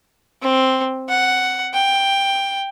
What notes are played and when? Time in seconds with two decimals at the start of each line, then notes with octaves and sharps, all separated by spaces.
0.42 C4
1.09 F#5
1.74 G5